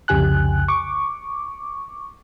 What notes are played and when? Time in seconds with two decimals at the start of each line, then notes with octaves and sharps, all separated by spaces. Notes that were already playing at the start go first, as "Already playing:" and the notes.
0.08 C2 F2 C#3 G4 G#5 F#6
0.68 C#6 D6